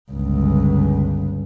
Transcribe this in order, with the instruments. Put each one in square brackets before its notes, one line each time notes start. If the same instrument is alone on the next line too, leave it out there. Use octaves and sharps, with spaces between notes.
[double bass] G1 C#2